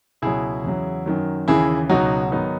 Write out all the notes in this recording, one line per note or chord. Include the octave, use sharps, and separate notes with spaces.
C#2 B2 F#3 E4 G#4
E2 C#3 F#3
F#2 D#3 F#3
D#2 C#3 E3 E4 G#4
C#2 B2 F#3 D#4 F#4
G#2 D#3 F#3 B3 D#4